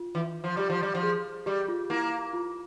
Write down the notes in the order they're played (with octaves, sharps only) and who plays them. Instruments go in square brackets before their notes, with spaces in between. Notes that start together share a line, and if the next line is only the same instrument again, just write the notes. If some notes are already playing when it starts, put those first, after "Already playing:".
Already playing: [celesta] F4
[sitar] E3
F3
[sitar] G3 [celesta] G4
[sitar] F3
G3
F3
[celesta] G#4
[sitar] G3 [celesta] G4
[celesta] F4
[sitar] A#3 [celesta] E4
[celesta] F4